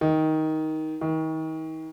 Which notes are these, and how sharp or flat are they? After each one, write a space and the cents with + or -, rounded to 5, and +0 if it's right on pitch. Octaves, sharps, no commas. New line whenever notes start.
D#3 +10
D#3 +35